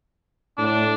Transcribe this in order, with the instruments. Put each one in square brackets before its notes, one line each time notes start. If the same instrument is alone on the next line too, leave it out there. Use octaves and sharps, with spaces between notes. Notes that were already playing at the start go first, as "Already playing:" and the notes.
[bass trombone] A2 [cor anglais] D4